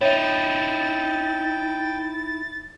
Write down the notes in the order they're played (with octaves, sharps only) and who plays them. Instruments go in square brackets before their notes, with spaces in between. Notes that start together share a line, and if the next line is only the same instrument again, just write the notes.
[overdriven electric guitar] D#4 E4 [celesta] C#5 E5 [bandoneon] G5 [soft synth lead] A6